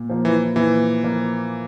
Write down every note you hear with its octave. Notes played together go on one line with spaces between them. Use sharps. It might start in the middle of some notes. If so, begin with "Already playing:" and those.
Already playing: A#2
F3 A#3
E3
A#2 E3
F3 A#3